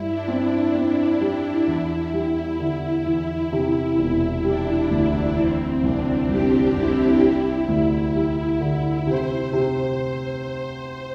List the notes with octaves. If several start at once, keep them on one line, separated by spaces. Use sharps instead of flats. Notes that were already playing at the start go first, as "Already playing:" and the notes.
Already playing: G2 E4
D4
C4
D4
C4 E4
G3
E2
G3
D3 E4
E2
C3
E1
G3 D4
D2 D4
E3 C4
C2 D4
C2 G4
C2 E4
G3
D2
G3
D3
C3 C5
C3